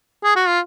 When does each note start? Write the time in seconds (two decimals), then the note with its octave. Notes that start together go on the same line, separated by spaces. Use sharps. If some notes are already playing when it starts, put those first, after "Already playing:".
0.24 G#4
0.36 F#4
0.48 F4